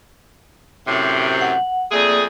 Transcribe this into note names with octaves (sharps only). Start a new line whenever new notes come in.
F#2 A2 C3
F#5
F2 A3 A#3 G#4 D5